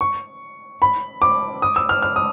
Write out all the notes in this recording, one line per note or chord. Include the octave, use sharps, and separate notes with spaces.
C#6
B5
D6
D#6
E6
F6
F6
D#6